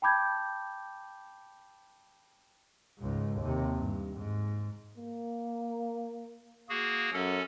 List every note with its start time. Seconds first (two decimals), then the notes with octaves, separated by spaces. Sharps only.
0.02 G5 A5 B5 D6 G6 G#6
2.99 C#2 G#2
3.39 D#2 C3
3.76 G2
4.17 G#2
4.98 A#3
6.69 A#3 F#4 G#4
7.13 F#2 C#4 A4